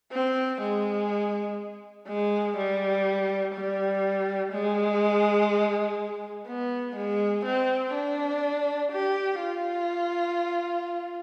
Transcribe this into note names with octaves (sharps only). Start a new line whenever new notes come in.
C4
G#3
G#3
G3
G3
G#3
B3
G#3
C4
D4
G4
F4